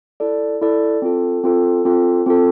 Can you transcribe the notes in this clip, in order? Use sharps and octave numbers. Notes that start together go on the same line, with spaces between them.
E4 A4 D5
E4 A4 D5
C4 F4 A4
C4 F4 A4
C4 F4 A4
C4 F4 A4